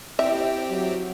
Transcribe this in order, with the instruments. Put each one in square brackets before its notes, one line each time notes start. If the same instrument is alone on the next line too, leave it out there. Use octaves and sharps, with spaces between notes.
[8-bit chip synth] C4 G4 [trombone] E4 [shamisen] E5
[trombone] F#3